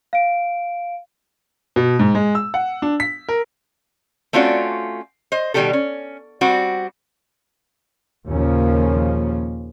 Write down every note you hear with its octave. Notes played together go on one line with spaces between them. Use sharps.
F5 D7
B2
G#2
G#3
E6
F#5
D4
B6
A#4
A3 C4 C#4 F4 F#4 D5
C5 D#5
B2 D#3 G3 G#3 G4 A4
C#4
G3 C4 F#4
D#2 A#2 C#3 F3 A#3 C#4